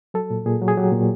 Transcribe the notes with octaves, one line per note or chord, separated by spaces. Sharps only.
F#3 A4
A#2
A#2 G#4
F#3
G#4
F#3 G4
A#2